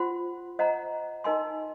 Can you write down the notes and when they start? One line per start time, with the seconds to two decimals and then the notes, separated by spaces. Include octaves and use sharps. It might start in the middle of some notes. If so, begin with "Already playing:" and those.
Already playing: F4 C5 F#5 C6
0.59 C5 D#5 F#5 A#5
1.24 D#4 A#4 D#5 G#5 C6